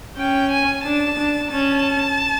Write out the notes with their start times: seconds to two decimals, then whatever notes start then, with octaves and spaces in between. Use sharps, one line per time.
0.17 C#4 G5
0.51 G#5
0.84 D4 A5
1.17 D4
1.51 C#4 A5